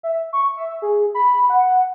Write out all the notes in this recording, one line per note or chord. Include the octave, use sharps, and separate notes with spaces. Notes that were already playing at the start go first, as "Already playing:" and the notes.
E5
C#6
E5
G#4
B5
F#5